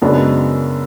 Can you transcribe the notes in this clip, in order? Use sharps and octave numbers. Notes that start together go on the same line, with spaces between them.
F#2 C#3 G#3 B3 D4